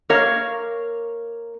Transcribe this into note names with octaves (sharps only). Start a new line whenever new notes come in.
A#3 A#4 C#5 F5